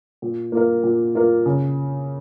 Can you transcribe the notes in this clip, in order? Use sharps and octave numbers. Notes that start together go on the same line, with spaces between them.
A#2
A#3 F4 A#4
A#2
A#3 F4 A#4
C#3